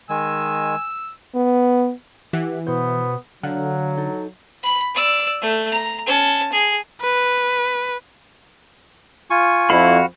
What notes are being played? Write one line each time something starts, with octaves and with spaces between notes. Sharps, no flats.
D#3 G#3 G#5 E6
B3
E3 G4 F#5
B2 B3 F#4 C5
D3 F#3 F5 F#5
D#4 A4
B5
D5 E6
A3
A#5
C#4 A5
G#4
B4
F4 G#5 C#6
F2 E4 F#4 F5 B5